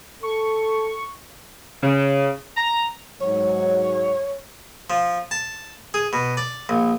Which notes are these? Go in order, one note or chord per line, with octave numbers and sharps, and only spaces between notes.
A4 C#6
C#3
A#5
G#2 F#3 C#5
F3
A5
G#4
B2
D5
A#1